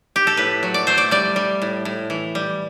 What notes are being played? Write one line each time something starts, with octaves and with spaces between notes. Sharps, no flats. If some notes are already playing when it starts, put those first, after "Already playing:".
G4
A4
A2 B4
F#3
D5
A3 C5
D5
G3 D5
G3
A2
A2
E3
G3